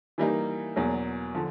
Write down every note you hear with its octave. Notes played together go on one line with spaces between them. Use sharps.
E3 G3 A#3 D#4
E2 B2 F#3 A#3
D3 F3